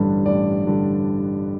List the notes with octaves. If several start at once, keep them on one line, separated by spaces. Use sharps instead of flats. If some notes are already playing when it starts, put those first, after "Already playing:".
Already playing: A1 G2 D3 G3
A1 D5
G2 D3 G3